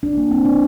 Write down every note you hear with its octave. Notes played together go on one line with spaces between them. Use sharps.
D4
A#3
C4
D4